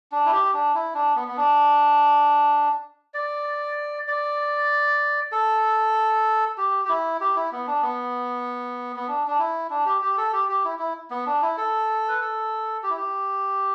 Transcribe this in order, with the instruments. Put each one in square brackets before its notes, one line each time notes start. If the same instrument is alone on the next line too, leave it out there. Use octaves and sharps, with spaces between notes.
[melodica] D4
E4
G4
D4
E4
D4
B3
B3
D4
D5
D5
A4
G4
G4
E4
G4
E4
B3
D4
B3
B3
D4
D4
E4
D4
G4
G4
A4
G4
G4
E4
E4
B3
D4
E4
A4
B4
A4
G4
E4
G4